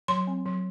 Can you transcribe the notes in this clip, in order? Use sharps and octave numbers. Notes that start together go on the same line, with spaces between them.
F#3 C6
C4
F#3